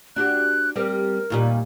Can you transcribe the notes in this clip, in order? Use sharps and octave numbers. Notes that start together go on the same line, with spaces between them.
D4 F#4 G4 F#6
G3 C4 G4 A#4
D#2 A#2 G3